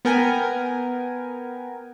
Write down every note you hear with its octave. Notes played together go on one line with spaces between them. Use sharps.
B3 A#4 G5 G#5